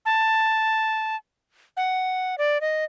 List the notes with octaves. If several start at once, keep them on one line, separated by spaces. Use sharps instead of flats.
A5
F#5
D5
D#5